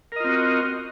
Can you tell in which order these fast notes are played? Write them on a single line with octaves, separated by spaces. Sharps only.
A#4 D#5 F4 C4 F#4